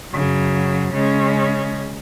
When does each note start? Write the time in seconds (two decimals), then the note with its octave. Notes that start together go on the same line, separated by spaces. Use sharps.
0.13 F#2 C#3 F#3
0.93 C#3 G#3 C#4